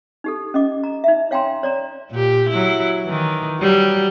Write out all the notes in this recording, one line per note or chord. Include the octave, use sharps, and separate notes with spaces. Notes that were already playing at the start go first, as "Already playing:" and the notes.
D#4 G4 A4
C#4 D#5 D6
A#5
D#4 E5
C#5 F5 G5 G#5 A#5 C6
C#5 D5 A#5
A#2 G4
F#3 E4
D#3 E3
F#3 G3